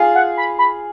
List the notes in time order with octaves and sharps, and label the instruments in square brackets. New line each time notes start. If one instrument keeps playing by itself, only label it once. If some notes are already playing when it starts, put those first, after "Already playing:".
Already playing: [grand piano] F4 G#4
[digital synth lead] F#5
B5
B5